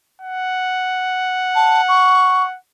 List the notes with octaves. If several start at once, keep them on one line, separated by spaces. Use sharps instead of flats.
F#5
A5
C#6